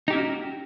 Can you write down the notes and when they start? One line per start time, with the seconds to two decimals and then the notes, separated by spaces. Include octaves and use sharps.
0.08 D#4
0.10 G4
0.13 E4
0.15 C#4
0.18 F#4